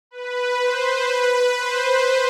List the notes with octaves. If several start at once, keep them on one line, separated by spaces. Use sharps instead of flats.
B4
C5
B4
C5